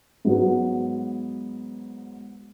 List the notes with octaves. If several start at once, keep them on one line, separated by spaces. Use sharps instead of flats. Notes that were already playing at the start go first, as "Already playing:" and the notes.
G#2 F#3 B3